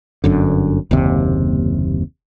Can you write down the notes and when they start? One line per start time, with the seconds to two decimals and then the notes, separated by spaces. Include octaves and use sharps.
0.24 G1 F#2 D3
0.91 F#1 D#2 C3